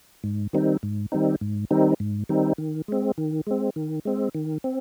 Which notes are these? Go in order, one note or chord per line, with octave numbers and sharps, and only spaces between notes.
G#2
D#3 G3 C4 D#4
G#2
D#3 G3 C4 D#4
G#2
D#3 G3 C4 D#4
G#2
D#3 G3 C4 D#4
D#3
G#3 C4
D#3
G#3 C4
D#3
G#3 C4
D#3
C4